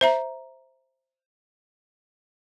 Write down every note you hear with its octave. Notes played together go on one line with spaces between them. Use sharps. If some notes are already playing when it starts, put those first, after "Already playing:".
C5 E5 A#5